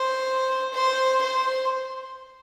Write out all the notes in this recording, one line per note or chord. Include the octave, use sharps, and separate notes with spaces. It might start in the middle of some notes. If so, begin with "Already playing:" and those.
Already playing: C5
C5
C5